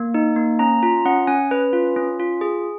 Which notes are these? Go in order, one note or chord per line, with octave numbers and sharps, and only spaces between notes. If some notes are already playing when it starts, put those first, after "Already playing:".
Already playing: A#3
D#4
A#3
C#4 A#5
F4 A#5
C#4 F#5
C#4 G#5
C#4 B4
F4
C#4
F4
G#4